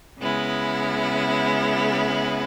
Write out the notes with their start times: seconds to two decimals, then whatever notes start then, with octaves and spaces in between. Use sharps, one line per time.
0.19 C#3 G#3 B3 E4